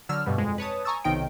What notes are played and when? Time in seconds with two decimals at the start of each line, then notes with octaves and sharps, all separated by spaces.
0.09 D3 F#3 E6 F6
0.26 G2 B2 G3
0.38 F2 G#3
0.58 B4 C#5 A5 D#6
0.84 G#5 A#5 C#6 D#6 E6 A6
1.04 B1 C3 D#3 D#4 G5 D7